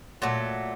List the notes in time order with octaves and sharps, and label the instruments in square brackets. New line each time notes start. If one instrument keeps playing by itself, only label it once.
[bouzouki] A#2 F#3 A3